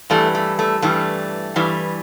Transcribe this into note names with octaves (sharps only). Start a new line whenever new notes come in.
G2 E3 G3 A3
A3
A3
G2 E3 G3 A3
G2 E3 G3